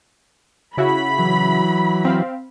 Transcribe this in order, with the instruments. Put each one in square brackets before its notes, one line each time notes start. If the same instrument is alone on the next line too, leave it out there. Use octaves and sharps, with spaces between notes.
[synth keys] C#3 E4 F#4 [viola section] B5
[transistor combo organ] E3 F#3
[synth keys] C4 F5